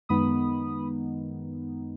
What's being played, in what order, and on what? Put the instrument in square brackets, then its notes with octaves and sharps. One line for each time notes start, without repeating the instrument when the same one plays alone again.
[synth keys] F#2 D#3 G#3 B3 D#4 B5 D#6